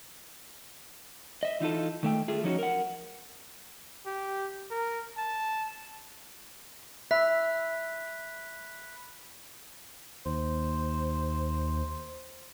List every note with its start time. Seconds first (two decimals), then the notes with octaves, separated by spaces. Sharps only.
1.43 D#5 E5
1.60 E3 D#4 F4 A4
2.03 D#3 A3 G5
2.28 A3 F4 G#4
2.44 F3 F#3 C#4 D#4 E4 F#4
2.59 A#4 F#5
4.06 G4
4.70 A#4
5.17 A5
7.11 E5 B5 F#6 B6
10.26 D#2 C5